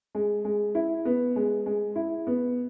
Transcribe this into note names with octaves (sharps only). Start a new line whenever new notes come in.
G#3
G#3
E4
B3
G#3
G#3
E4
B3